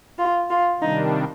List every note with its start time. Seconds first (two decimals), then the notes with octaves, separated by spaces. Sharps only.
0.18 F4
0.49 F4
0.80 C3 D#3 G3 D4 D#4